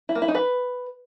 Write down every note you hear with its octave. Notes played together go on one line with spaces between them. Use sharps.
E4
A#3
E4
D#4
B4